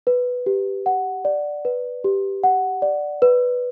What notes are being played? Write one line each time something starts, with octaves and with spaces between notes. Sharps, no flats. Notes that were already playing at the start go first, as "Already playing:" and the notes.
B4
G4
F#5
D5
B4
G4
F#5
D5
B4